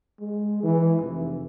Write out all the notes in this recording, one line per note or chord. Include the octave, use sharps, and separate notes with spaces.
G#3
E3
F1